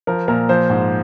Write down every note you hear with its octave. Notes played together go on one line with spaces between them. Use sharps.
F3 A#4
A#2 A#4
F3 C5
G#2